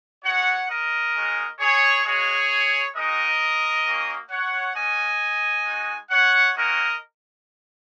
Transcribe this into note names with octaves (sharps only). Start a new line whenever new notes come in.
G#3 F#4 C#5 F#5
A#4 D#5
G#3 C#4 F#4
G#4 C#5
G#3 F#4 G#4 C#5
G#3 D#4 F#4 A#4 D#5
A#3 C#4 F#4
C#5 F#5
A#3 C#4 F#4 D#5 G#5
G#3 D#4 F#4
C#5 F#5
A#3 C#4 F#4 A#4 D#5